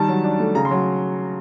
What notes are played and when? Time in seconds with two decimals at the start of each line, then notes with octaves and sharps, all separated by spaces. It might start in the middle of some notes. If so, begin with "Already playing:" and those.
Already playing: D#3 G3 A5
0.08 F#3
0.24 D4
0.40 A3
0.55 C#3 A#5
0.65 C6
0.71 F#3